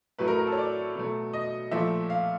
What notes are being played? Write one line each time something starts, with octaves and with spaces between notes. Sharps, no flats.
A2 F#3 A3 B4
A#4
A#4
A4
C#5
D5
B2 F#3 A3
D#5
A#2 F3 A3 E5
F5